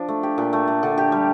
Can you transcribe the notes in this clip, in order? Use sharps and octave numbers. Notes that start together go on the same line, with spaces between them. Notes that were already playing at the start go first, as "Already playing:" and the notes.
Already playing: F3 D4
A3
G4
A#2
A3
A3
D3
G4
G3